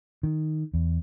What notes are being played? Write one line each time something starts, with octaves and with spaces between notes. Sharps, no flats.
D#3
E2